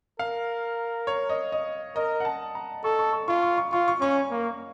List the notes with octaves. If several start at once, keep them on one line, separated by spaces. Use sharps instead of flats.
A#4 F5
C#5
D#5
D#5
A#4 D#5
F#5
A5
A#5
A4 C#6
C#6
C#6
F4 C#6
C#6
C#6
F4 C#6
C#6
C#4 C#6
A#3